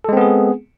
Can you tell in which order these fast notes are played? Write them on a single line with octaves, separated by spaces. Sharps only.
A4 G#3 C4 B3 G#4